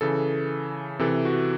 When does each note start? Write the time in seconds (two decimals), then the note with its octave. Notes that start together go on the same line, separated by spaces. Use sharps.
0.01 C#3 E3 A4
0.99 C3 E3 A4
1.25 F#4